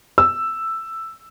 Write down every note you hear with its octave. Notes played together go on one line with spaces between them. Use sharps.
E6